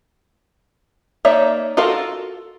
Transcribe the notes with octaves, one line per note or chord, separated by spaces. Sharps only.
A#3 D#4 C#5 D5 E5
F4 F#4 A4 A#4 F5